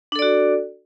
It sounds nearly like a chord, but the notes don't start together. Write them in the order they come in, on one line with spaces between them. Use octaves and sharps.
D4 A4 D5 F#4